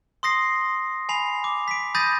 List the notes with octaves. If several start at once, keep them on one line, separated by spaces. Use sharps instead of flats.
C6 D#6 A#6 C7
G#5 B5 C7 F7
D6
B6 D7
B5 D#6 G6 A6 A#6 D#7